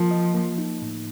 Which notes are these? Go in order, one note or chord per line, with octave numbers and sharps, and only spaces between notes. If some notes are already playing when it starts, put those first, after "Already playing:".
Already playing: F3 A#3 F4 A#4
D#5
A#3
D#4
A2